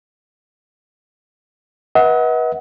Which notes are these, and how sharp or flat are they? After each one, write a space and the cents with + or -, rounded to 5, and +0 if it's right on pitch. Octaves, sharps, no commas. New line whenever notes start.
B4 -30 D#5 +45 F#5 +0